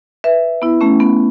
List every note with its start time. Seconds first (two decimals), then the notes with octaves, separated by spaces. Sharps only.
0.24 B4 E5
0.62 B3 E4
0.81 A3 C#4
1.00 B3